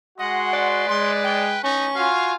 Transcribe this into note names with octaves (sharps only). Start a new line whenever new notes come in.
G#3 F#4 D#5 F#5 C6
B4 D5
G#3 C6
G5
C#4 D#4 C#6
F4 F#4 F5 G#5